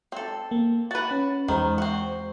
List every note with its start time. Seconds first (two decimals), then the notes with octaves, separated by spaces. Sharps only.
0.12 C4 A4
0.51 A#3
0.91 F#4 B4 A6
1.11 C#4
1.48 E2 D#3 G#3 C5
1.78 C4 F#4